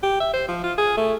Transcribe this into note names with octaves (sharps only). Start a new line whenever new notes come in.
G4
E5
C5
F3
F4
G#4
A3